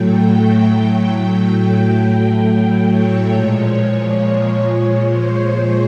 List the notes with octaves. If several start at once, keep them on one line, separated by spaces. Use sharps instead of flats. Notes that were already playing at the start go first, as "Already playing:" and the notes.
Already playing: A2 F#3 A3 G5
G5
G5
C#5
A#2 F3 G#3
C5